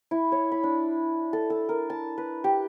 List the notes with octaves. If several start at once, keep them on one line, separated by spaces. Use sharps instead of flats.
E4
C#5
B5
D4
A4
A4
A#4
A5
B4
G4